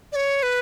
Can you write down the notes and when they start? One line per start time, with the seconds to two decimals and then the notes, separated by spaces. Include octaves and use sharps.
0.12 D5
0.16 C#5
0.43 B4